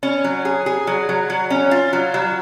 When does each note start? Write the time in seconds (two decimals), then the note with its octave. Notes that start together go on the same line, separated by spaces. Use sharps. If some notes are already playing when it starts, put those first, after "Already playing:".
0.03 C#4
0.24 F#3
0.45 G#4
0.66 G#4
0.87 F#3
1.09 F#3
1.30 F#3
1.50 C#4
1.71 F4
1.93 F#3
2.14 F#3